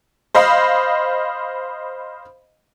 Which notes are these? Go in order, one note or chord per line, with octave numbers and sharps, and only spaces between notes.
C5 D#5 F5 B5